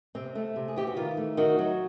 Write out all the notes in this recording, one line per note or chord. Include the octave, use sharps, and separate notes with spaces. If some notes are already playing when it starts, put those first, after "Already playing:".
C3 C4
A3
C3
G#4
E3 G4
F#4
D#3 F4
A3
D#3 F#4
F#3